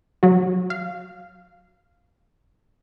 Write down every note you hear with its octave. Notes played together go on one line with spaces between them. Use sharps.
F#3 F#4
F5